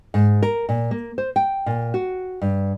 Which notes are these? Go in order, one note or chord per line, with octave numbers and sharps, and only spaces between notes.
G#2
A#4
A#2
A#3
C5
G5
A#2
F#4
G2